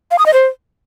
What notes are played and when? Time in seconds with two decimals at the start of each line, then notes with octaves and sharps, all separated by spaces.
0.11 F5
0.19 D#6
0.26 D#5
0.34 C5